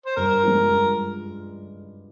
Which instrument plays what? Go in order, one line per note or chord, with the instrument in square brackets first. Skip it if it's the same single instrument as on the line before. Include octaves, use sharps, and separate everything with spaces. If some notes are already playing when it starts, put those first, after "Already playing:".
[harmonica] C5
[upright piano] G2 [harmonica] A#4
[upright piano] F3 G#3
G2